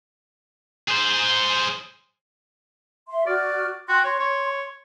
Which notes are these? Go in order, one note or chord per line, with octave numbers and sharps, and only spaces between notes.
G#4 C5
E5 C6
F#4 D5 F6
F#4 G5 C6
C#5 C6
C#5